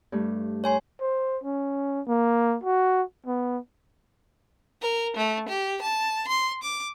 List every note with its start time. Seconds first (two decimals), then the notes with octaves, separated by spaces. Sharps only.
0.12 G2 A3
0.64 C#5 G#5 C6
1.01 C5
1.44 C#4
2.08 A#3
2.63 F#4
3.26 B3
4.82 A#4
5.17 A3
5.49 G4
5.82 A5
6.28 C6
6.63 D6